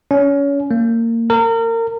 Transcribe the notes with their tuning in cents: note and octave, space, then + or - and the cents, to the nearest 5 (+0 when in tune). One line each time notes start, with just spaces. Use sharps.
C#4 +25
A#3 -25
A#4 -30